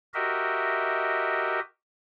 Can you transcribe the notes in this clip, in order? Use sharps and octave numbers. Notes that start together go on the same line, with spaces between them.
F#4 G4 A#4 D#5 E5